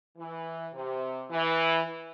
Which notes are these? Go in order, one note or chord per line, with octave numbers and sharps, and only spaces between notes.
E3
C3
E3